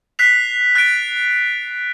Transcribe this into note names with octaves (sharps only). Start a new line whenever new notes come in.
F#6 B6 C7 F7
F#6 A6 D7